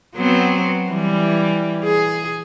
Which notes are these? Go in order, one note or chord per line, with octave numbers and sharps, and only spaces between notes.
F#3 B3 C4
E3 G3
G#4